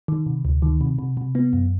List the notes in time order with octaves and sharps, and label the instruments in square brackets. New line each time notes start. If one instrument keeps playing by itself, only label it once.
[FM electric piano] D#3
C3
D2
D#3
C3
C3
C3
B3
F#2